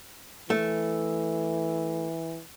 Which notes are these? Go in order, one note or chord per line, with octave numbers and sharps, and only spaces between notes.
E3 A3